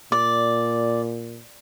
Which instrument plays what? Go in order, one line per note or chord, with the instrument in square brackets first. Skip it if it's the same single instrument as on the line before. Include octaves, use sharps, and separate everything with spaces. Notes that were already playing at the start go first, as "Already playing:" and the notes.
[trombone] A#2 [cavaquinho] D5